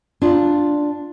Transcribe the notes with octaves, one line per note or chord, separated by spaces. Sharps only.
D4 F4